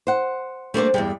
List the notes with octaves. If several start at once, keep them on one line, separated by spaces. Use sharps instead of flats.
C5 F#5
G3 A3 A#3 D4 C5
E2 G2 G3 G#3